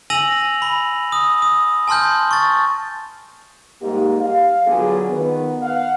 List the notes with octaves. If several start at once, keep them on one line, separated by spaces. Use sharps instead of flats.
G#5 E6 A#6 D#7 F7 F#7
B5
D#6
D#6
G#5 A5 C6 F6 G6
C#6 A6
G#2 G3 A#3 D#4 G4
F5
D3 F#3 B3 F4 G#4
D#3 B3
F5 F#5